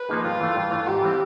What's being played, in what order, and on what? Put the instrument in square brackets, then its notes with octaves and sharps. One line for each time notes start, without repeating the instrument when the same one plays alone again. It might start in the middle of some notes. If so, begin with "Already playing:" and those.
Already playing: [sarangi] B4
[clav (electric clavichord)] F3 A#3 D#4 G#4
[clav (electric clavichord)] G2 [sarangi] F4
[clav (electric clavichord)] E3 A3
G2
E3 A3
[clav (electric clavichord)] G#2 [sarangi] G4
[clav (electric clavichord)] E3 G3 C4